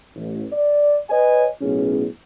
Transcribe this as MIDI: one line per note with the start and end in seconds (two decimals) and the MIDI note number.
0.15 0.44 33
0.52 0.96 74
1.10 1.46 71
1.10 1.46 73
1.10 1.46 75
1.10 1.46 80
1.61 2.06 35
1.61 2.06 45
1.61 2.06 59
1.61 2.06 61
1.61 2.06 64
1.61 2.06 68